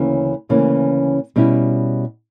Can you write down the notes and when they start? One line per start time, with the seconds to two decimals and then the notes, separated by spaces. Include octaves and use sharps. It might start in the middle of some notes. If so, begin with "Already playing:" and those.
Already playing: D2 C#3 E3 A#3 C#4
0.49 D2 C#3 E3 A#3 C#4
1.36 B2 G3 C#4 E4